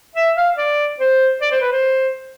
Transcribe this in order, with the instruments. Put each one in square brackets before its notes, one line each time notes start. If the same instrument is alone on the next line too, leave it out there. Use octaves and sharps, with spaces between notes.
[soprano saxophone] E5
F5
D5
C5
D5
C5
B4
C5